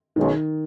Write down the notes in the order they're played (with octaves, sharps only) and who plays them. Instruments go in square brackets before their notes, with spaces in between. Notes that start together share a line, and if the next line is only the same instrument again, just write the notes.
[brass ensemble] B1 B2 G#3 C#4 G#4 [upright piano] D#3